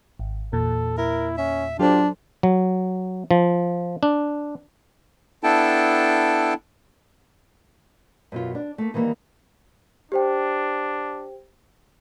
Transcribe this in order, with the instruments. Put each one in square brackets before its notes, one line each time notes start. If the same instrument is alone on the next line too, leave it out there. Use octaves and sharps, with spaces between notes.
[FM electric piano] G#1
[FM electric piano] E2 A#2 [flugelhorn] A4
[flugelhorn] E4 [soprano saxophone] A#4
[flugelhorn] C#4 [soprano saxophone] E5
[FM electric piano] F#3 A4 C5 [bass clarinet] D4 [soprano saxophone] F4 [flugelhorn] G4
[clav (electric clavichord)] F#3
F3
D4
[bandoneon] B3 D4 E4 A4 G5 A5
[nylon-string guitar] F#2 B2 F4
D4
A3 A#3
D#3 E3 G3 A#3 D#4
[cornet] D4 [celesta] G4 C5 G5